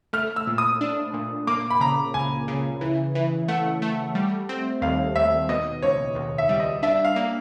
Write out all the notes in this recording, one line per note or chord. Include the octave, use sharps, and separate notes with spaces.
A3 F6
E6
A#2
D#6
D4
A#2
A#3 D6
B5
C#3 A#5
C#2 G#5
C#3
E3
E3
A3 F#5
A3
G3
C4
D#2 F5
D#2 E5
B2 D#5
C#2 C#5
C#2
E5
G3
D#5
D4 E5
F5
A#3